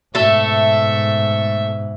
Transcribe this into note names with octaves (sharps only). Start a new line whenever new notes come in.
G#2 B2 A3 A4 E5